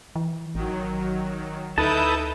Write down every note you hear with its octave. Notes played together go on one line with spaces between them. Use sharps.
E3
A1 D#3 F#3
D2 D#4 E4 A4 B4 E5 A5 G6